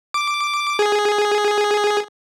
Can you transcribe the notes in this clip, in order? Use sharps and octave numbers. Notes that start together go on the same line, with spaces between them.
D6
G#4